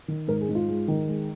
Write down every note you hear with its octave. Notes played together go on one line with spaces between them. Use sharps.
D#3
G#2 A#4
G#4
G#2
F4
G#3
D#3
G#3